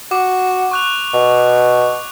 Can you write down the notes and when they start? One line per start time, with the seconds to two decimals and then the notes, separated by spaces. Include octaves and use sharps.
0.11 F#4 D6
0.71 C#6 F#6 F7
1.14 B2